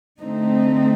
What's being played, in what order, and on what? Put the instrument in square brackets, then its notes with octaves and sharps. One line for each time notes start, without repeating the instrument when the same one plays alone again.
[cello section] D3 A3 C4 D#4